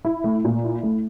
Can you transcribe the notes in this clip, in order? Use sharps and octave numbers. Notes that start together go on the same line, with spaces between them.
E4
A3
A#2
E4
A3